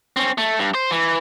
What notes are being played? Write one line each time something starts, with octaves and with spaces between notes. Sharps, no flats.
C4 C#4
A3
G2
C5
E3